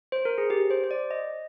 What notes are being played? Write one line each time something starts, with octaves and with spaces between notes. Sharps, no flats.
C5
A#4
G#4
G4
C5
C5
D5
D#5